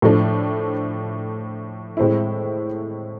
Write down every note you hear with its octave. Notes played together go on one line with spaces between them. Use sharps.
A2 F3 A3 D4
A2 G#3 C4 E4